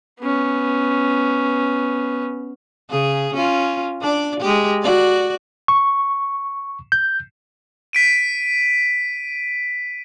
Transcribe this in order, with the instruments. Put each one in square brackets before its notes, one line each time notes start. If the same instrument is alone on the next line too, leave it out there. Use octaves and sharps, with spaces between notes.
[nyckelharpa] B3 C#4
[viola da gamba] C#3 G#4
C#4 F4
D4 D5
G#3 G4
F#4 D5
[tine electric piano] C#6
G6
[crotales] B6 D7 D#7